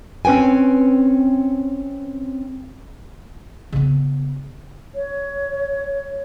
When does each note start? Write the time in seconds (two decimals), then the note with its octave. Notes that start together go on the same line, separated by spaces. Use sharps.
0.25 C4 C#4 B4 G5 G#5
3.73 C#3 B3
4.95 C#5